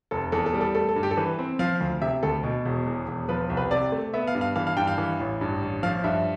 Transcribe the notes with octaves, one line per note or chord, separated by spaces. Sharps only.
F1 A4
E2 A4
A4
G3
A4
A3 A4
A4
G2
G4
A4
E3 B4
C4
F3 F5
D2
C3 E5
D2 A4
B2
E1
E2
E1
F3 B4
C2
B4
C3 D5
A3
B3 E5
F5
G2
F5
E3 F5
F5
G2 G5
F5
E3
A1
G2
A1
F3 F5
G2 E5